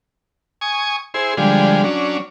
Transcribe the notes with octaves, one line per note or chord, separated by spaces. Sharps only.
G#5 C#6 D#6
E4 G#4 C5
D3 F3 G3 G#3
F#3 C#4 D4